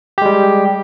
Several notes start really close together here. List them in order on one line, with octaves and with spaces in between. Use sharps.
G4 G#3 G3